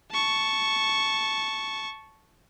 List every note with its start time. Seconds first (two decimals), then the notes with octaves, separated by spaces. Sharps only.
0.11 A5 C#6